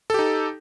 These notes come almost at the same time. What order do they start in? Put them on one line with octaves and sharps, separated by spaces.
A4 G4 D#4